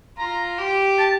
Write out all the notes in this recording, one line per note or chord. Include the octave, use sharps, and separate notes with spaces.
F4 A#5
G4
A5